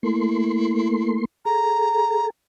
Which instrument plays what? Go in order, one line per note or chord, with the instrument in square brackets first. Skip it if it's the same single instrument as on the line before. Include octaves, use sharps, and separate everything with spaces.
[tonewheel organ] A3 A#3 C6 [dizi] E4
[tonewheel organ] G#4 A4 [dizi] A#5